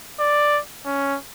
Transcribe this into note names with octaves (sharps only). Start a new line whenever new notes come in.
D5
C#4